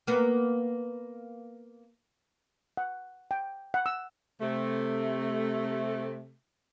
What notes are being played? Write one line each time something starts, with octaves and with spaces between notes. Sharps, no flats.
A#3 B3
F#5
G5
F#5
E6
C3 A3